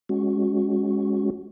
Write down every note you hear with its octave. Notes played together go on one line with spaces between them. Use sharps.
G#3 C#4 F#4